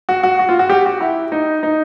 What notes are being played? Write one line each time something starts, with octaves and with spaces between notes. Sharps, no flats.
F#4
F#4
F#4
F4
F#4
G4
F#4
E4
D#4
D#4